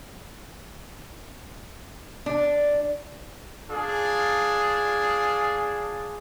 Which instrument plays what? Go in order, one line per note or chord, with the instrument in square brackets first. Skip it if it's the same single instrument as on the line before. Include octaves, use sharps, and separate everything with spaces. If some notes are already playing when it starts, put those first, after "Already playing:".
[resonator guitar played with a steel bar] D4
[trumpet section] D4 F4 G#4